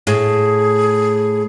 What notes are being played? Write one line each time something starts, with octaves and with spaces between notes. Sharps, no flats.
A2 G#4